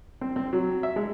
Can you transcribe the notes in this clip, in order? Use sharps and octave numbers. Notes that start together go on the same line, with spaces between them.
C4
C4
F#3
E5
G#3